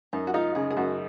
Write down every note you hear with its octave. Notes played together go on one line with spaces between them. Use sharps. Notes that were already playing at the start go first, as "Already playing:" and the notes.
F#2 D#4
F#4
D#4 F4
C#3 G#4
G#4
F#2 F#4